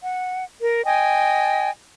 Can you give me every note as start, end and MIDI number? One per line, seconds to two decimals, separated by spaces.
0.02 0.44 78
0.61 0.83 70
0.84 1.70 75
0.84 1.70 79
0.84 1.70 80